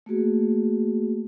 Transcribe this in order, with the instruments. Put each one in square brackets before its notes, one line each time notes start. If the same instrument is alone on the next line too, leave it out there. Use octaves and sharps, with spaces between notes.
[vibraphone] A3 A#3 F#4 G#4